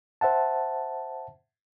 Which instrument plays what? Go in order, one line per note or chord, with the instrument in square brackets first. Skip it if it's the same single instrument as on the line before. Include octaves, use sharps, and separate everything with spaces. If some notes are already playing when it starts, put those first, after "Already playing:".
[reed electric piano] C5 E5 F#5 A5